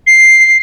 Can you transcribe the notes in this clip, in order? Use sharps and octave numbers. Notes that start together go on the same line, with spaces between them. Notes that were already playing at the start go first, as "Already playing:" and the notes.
C7